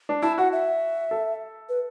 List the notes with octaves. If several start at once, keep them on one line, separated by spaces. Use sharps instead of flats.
D4
E4 A5
F#4 F#5
E5
A4
B4